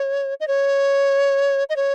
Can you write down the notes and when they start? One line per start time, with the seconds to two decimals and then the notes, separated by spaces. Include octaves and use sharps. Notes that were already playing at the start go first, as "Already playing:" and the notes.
Already playing: C#5
0.40 D#5
0.48 C#5
1.70 D#5
1.76 C#5